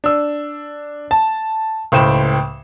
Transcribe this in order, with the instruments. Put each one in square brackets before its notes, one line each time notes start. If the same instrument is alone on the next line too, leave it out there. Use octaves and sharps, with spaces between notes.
[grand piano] D4 E6
A5
C#2 A2 C5 G5 E7